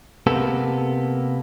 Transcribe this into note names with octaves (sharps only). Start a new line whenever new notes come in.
C3 A#3 B3 A4